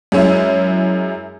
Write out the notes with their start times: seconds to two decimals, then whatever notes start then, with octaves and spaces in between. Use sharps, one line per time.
0.12 F#2 G#3 C#4 E4